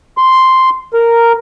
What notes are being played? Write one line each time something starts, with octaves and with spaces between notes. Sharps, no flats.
C6
A#4